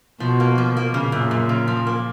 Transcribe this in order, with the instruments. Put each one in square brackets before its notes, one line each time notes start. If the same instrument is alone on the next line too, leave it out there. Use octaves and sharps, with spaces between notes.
[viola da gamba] B2 [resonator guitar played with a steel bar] F3
[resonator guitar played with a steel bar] A#3
F3
A#3
[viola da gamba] A#2 [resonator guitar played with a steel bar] C#3
[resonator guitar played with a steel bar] F#2
F#2
C#3
F3
A#3